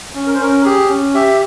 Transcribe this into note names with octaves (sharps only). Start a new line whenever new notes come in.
C#4
A#4
C5
C#4 A#4
G4 G#4
C#4
G4 E5